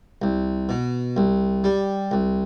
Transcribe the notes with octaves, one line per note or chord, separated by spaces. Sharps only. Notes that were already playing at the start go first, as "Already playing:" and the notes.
C2
B2
C2
G3
C2